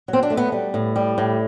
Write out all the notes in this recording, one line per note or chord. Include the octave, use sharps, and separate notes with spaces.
F#3
C4
D4
A3
B3
G3
A2
G3
A2